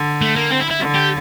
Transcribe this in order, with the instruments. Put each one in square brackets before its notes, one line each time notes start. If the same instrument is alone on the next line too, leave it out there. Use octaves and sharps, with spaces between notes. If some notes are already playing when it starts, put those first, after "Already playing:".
Already playing: [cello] D3
[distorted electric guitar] A3
A#3
C4
E4
E4
[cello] D3
[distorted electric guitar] G4